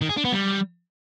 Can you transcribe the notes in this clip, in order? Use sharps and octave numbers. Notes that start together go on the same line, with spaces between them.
D#3
G#4
D4
B3
G3